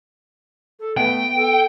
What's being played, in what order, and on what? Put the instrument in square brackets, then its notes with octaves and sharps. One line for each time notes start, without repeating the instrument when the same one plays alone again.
[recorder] A4
[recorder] A3 [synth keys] B3 [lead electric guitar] G5
[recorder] A4